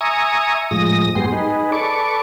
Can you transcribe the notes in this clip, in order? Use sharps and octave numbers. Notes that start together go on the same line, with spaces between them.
E5 G#5 A#5 C#6 D#6
A2 F3 G#3 D#6 A#6
G#2 F#3 B3 G4 G#4 C6
D#4 G#4 B4
A4 B4 D5 C#6 D6